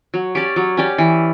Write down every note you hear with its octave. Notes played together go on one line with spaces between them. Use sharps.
F#3
C#4 G4 D5
F#3
C#4 G4 D5
E3